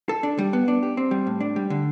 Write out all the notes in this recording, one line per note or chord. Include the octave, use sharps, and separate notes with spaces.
A4
D4
G3
B3
D4
G4
C4
G3
A2
D4
G3
D3